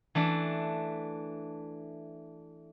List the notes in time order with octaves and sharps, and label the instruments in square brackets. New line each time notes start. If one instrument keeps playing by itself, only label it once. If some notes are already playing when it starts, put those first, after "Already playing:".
[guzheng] E3 A3 D4